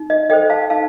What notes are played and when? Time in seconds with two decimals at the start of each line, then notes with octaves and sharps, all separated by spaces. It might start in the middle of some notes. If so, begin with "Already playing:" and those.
Already playing: D#4
0.10 D#5
0.30 A4 C5 D#5 G5
0.50 F5 A5
0.70 D#4 F5 A5